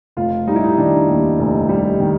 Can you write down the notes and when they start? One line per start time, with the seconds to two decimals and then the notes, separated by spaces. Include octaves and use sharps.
0.17 F1 F4
0.47 G3 D#4
0.56 E4
0.64 D#4
0.78 D#3 D4
1.08 D#2
1.39 F1
1.69 G3
2.00 D#3